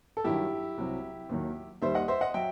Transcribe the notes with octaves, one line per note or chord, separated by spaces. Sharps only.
A4
G2 D#3 F#3 E4 G4
C2 C3 F#3
D#2 D#3 F#3
D#2 D#3 G3 C5 E5
D#5 F#5
C5 E5
D#5 F#5
F#3 E5 G5